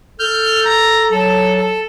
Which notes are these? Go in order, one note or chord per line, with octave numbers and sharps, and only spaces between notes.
A4 F6 G6
A#5
F#3 A4
A4